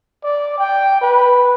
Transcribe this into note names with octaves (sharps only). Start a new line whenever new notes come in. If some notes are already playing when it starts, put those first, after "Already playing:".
D5
G5
B4